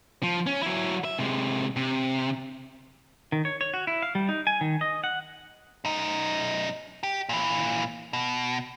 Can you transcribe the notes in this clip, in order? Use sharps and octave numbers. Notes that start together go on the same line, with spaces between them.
F3
C#4
F#3 E4
E5
C3 G#3
C3
D#3
C#5
C#5
F#4
E4
F5
G3
D#4
G#5
D#3
D#5
F#5
F#2 D#4
G4
A#2 E3
B2